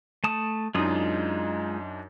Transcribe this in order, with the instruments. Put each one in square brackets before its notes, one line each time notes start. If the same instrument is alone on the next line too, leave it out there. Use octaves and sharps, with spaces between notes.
[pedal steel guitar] A3 A5 D#6
[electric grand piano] F#2 D4 D#4 [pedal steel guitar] G#3 F4 D#6